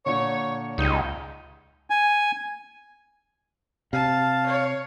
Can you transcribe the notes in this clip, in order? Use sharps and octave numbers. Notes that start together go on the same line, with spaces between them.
A#2 D3 C#5
C#2 G3 D#4
G#5
C3 F5 A5
C#5